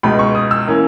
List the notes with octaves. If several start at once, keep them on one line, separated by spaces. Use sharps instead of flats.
C#2 B2 G#3 B5
C#6
D#6
E6
E3 A#3 C#4